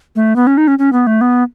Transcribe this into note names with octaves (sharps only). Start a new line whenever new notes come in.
A3
B3
C#4
D#4
C#4
C#4
B3
A3
B3